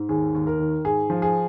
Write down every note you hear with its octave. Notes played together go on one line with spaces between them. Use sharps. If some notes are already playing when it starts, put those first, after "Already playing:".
Already playing: G#2
D#2 G#4
D#2
A#4
D#3
G#2 G#4
F3
G#4